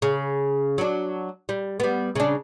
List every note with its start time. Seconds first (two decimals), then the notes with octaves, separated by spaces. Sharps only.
0.02 C#3
0.78 F#3 D4
1.49 G3
1.80 G3 B3
2.15 C#3 D4